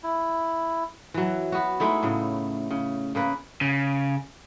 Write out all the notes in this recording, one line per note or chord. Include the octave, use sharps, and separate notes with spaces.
E4
E3 F#3
B3 F#4
G#3 A3 D#4 E4
A2 C#3
C#3
C#3 A#3 B4
C#3